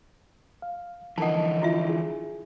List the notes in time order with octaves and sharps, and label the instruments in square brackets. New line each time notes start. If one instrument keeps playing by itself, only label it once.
[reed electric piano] F5
[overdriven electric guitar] D3 E3 [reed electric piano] F3 A#4 D#5 [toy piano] F#5 A5
[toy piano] E4 F4 E5
[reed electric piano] G#4